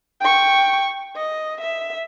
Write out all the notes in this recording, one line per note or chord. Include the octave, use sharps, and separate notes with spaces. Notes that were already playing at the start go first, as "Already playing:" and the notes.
G5 C#6
D#5
E5